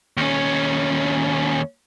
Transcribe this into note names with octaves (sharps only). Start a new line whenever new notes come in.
D#2 C#4